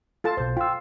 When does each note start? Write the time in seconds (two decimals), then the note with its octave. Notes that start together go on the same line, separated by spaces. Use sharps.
0.24 F4 A4 A5
0.37 B1 B2 C5
0.57 F4 G5 E6